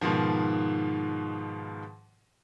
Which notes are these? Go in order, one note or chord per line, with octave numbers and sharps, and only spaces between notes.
G#2 B2 D#3 F3